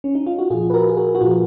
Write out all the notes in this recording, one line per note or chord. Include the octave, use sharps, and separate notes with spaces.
C#4
D#4
F4
F#4
A#2 F3 F4 G#4
B4
F#4 A#4
G#4
F#4 A#4
F#4
A#2 F3 F4 G#4